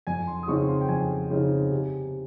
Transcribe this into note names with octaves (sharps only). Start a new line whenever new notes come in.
F2 G#5
C6
D#6
C#3 F3 C4 D#4 C#6
C6
G5
F2 G#5
C#3 F3 C4 D#4
C3